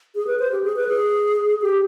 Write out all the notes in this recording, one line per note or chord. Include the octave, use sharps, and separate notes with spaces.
G#4
B4
C5
G4
G#4
B4
G#4
G4